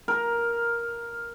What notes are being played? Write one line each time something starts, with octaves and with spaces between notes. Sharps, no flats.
A#4